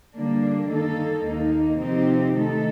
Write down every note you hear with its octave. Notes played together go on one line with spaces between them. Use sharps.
D3 G3 A#3 D4
D#3 A#3 D#4 A4
D#2 D#3 A#3 D#4
C3 F3 C4 D#4 G4
D#3 A3 D#4 A4